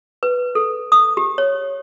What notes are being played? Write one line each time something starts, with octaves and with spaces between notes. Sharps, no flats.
B4
A4
D#6
G4
C#5